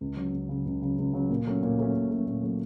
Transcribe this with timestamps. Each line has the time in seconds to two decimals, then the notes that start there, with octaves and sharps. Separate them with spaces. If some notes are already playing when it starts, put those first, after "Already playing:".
0.01 C#2
0.17 C#3 F#3
0.33 C#2
0.49 C#3 F#3
0.66 C#2
0.82 C#3 F#3
0.98 C#2
1.13 C#3 F#3
1.30 A#2
1.47 F#3 A3 C#4
1.63 A#2
1.78 F#3 A3 C#4
1.94 A#2
2.10 F#3 A3 C#4
2.27 A#2
2.43 F#3 A3 C#4